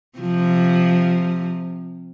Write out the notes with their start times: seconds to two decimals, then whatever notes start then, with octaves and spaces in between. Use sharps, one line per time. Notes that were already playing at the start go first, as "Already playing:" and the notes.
0.19 C3 F3